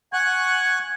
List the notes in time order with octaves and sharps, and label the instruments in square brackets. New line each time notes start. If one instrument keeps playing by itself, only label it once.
[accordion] F#5 C#6 F#6 [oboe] G#5